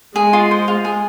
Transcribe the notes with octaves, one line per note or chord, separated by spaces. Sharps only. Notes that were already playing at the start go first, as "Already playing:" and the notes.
G#3 G#4
F4
C5
F4
G#4